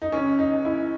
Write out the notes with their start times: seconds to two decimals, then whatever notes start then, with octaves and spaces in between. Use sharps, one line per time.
0.02 D#4
0.12 C#2 C#4
0.39 D#4
0.52 C#2
0.65 E4